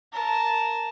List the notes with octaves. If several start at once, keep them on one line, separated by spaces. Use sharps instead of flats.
A#4 A5